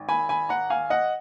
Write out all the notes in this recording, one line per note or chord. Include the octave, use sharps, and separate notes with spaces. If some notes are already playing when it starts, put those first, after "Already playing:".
Already playing: G#1
G#5 B5
G#5 B5
F#5 A#5
F5 G#5
D#5 F#5